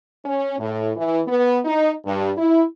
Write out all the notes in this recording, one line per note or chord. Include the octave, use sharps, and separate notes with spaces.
C#4
A2
E3
B3
D#4
G2
E4